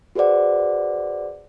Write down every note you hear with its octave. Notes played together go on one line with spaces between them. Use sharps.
F#4 G#4 B4 C5 D5 F#5